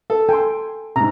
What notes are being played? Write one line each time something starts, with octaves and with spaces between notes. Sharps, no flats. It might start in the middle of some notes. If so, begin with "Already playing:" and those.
A4
A4 G5 G#5 C6
C2 G#2 A#5